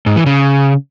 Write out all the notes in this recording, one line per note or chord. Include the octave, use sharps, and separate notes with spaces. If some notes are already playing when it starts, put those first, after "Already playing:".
G#2
E3
C#3